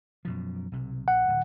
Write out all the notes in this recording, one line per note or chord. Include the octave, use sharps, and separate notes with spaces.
F#2 B2 F3
B1 C3
A#1 F#5
D1